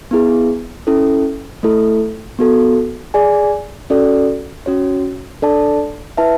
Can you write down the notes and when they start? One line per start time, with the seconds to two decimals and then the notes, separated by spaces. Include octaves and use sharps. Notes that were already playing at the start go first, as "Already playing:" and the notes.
0.11 B3 E4 G#4
0.87 C#4 E4 A4
1.63 A3 E4 A4
2.39 B3 F#4 A4
3.14 G#4 D5 G#5
3.90 C#4 F#4 A4 D5
4.66 C#4 F#4 C#5
5.42 D4 A4 D5 A5
6.17 E4 B4 E5 A5